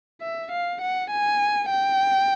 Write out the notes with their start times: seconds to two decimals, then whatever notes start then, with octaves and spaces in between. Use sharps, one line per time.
0.22 E5
0.52 F5
0.81 F#5
1.11 G#5
1.71 G5